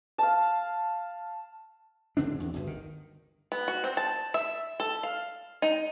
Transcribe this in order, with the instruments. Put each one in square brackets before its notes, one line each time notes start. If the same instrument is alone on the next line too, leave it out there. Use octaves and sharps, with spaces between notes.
[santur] F5 A5
[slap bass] D1 D3 C4 D4
E2
G1 D2
D#3
[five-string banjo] B3
F#4
C4
A5
E5
A4
F5
D#4